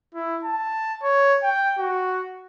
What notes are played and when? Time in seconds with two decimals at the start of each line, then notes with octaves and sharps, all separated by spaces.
0.15 E4
0.45 A5
1.03 C#5
1.43 G5
1.79 F#4